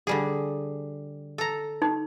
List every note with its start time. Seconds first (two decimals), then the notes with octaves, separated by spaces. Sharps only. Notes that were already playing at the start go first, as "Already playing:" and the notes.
0.07 D3 G3 G#4
1.38 A4 A#5
1.82 D#4